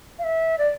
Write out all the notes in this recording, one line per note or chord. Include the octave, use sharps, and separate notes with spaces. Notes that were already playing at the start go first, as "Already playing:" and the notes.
F5
E5
D5